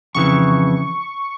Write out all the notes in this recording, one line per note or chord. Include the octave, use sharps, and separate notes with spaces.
F2 C#3 E3 C#6